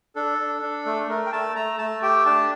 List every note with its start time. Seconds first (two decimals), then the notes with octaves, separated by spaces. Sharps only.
0.15 D4 A4
0.38 D4
0.62 D4
0.86 A3
1.09 A3 A#4
1.26 G5
1.32 A3 A5
1.56 A3 A#5
1.78 A3 A5
2.02 G4 G5
2.26 D4 A5